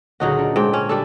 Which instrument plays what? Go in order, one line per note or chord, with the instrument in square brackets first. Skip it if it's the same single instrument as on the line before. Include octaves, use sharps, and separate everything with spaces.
[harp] C#2 A#2 D3 [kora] F#3 D#4 F#4
[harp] D4
[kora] G#2 G5
C#4
[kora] G3 D4 A4 [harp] C#6